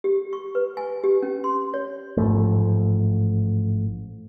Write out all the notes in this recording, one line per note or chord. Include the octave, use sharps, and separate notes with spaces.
G4
C#6
B4
G#5
G4
C#4
C6
C#5
A1 G#2 F3 A3